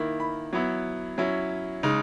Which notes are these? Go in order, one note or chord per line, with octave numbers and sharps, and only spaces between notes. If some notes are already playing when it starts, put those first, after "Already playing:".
Already playing: D#3 A#3 E4
B5
F#3 B3 E4
F#3 C#4 E4
C#3 G#3 D#4